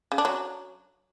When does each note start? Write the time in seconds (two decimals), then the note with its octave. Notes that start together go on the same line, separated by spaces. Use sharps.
0.12 C#3
0.18 D4
0.25 F#3